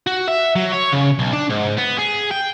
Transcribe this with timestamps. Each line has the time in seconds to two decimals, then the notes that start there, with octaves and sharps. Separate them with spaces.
0.07 F#4
0.28 E5
0.56 F#3
0.72 C#5
0.92 C#3
1.19 B1
1.33 D4
1.50 G#2
1.78 B3
1.99 G#4
2.31 G5